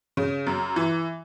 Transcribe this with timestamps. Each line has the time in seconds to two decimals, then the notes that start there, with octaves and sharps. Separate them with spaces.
0.17 C#3
0.46 F#2
0.76 E3